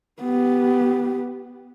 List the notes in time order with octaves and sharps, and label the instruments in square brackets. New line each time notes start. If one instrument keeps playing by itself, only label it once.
[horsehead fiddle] B3 G4